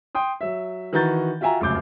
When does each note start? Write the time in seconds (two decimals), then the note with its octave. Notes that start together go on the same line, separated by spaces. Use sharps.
0.15 G5 C6 D#6
0.41 F#3 E5
0.93 D#3 E3 F#4 A#5 G6 A6
1.41 F4 F#4 E5 G5 G#5 A#5
1.61 F1 C#2 F#2 D6 G6